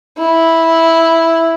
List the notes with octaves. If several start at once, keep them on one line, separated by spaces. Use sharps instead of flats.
E4